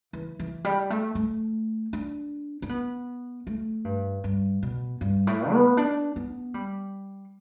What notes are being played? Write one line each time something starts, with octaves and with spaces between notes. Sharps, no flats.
E3
E3
G3
A3
A3
D4
D4
B3
A3
G2
G2
B2
G2
A2
B3
D4
B3
G3